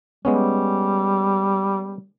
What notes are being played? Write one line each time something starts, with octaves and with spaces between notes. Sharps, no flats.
G3 G#3 B3 C#4